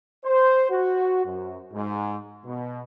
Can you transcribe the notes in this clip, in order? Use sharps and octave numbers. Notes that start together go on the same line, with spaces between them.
C5
F#4
F#2
G#2
B2